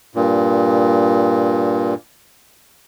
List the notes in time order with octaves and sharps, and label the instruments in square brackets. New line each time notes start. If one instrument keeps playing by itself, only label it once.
[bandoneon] G2 A#2